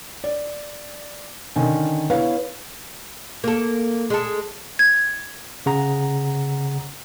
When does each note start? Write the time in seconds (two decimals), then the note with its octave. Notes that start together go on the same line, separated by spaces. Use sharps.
0.24 D5
1.56 D3 D#3 C#4 G#5
2.10 B3 E4 B4 C#5 F5
3.44 A#3 A4
4.10 G#3 A4
4.79 G#6
5.66 C#3 F#5 A#5